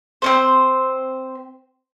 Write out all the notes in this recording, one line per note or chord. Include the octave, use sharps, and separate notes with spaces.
C4 C#4 C5